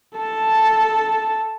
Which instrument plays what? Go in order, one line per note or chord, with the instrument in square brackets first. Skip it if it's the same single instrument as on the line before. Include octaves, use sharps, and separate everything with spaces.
[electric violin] A4 A5